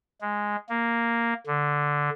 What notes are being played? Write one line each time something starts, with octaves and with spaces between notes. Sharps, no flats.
G#3
A#3
D3